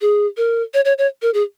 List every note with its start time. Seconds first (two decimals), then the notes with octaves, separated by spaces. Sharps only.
0.01 G#4
0.37 A#4
0.74 C#5
0.85 C#5
0.98 C#5
1.22 A#4
1.34 G#4